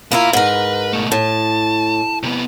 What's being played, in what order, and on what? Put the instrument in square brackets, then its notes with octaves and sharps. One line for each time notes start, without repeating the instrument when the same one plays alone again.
[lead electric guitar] B2 A#5 [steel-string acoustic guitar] A#3 E4 F4
[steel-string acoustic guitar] G#2 A#4 [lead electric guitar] B4
[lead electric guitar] B2 A3
[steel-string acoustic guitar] A2 [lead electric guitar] A5
[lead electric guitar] C3 B3